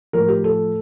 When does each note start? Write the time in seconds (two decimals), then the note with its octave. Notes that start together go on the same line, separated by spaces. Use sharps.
0.13 A2 F3 A#4
0.28 G4
0.44 A4